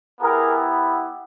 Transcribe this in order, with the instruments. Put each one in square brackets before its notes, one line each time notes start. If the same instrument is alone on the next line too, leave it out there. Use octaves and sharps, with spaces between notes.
[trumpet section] B3 E4 G4 G#4 A#4